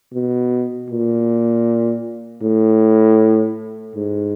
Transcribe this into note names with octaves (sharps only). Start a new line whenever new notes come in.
B2
A#2
A2
G#2